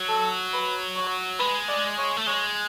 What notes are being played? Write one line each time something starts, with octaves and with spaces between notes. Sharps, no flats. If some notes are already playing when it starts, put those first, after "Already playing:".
Already playing: F#3
A4
B4
C#5
G#3 B4
D5
C#5
A3
G#3 C#5